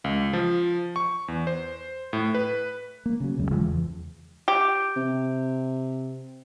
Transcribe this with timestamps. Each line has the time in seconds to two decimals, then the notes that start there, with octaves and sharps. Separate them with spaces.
0.04 C#2
0.33 F3
0.96 C#6
1.28 E2
1.47 C5
2.13 A2
2.34 B4
3.06 A#3
3.20 C#3 F#3
3.37 E1 C#2 F#2 C#3
3.51 E2 C#3 F3 G#3
3.66 E2
4.48 G4
4.96 C3